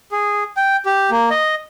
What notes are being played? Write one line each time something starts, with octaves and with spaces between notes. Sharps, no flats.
G#4
G5
G4
A#3
D#5